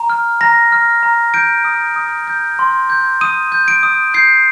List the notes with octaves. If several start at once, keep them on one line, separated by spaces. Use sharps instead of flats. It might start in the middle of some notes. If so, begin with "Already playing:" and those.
Already playing: A#5
F6
A#5 A#6
F6
A#5
G6 D7
D#6
D#6
G6
C6
G6
D#6 D#7
G6
D7
D#6
G6 C7